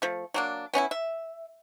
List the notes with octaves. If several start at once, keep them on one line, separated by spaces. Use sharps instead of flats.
F3 A3
F#3 A#3 D4
B3 C#4 D#4 E4
E5